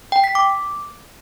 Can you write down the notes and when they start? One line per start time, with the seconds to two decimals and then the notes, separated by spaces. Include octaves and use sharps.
0.12 G5
0.24 B6
0.35 D6